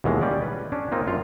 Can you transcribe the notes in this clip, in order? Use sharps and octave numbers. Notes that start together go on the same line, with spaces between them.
D#2 B2 E3 G#3 F5
G3 C#4 D5
B4
C#4 D4
A#3 C4 D#4 F4
F#2 F4 F5